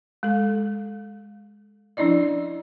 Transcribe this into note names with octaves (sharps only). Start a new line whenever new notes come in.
G#3 A4
F3 C#4 D4 E4 D5 D#5